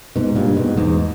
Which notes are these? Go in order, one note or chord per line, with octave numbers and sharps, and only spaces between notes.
G#2 B2
G2 A#2
G#2 B2
E2 G#2